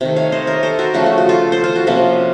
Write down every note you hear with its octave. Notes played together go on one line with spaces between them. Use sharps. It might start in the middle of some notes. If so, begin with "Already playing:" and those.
C3 D#3 A3
C#5 F5
C5 D#5
A#4 C#5
A4 C5
F#4 A#4
C#3 F3 A3 F#4
F#4
F#4
F4 A4
A4 C5
F4 A4
F#4
C3 F3 A#3 C#4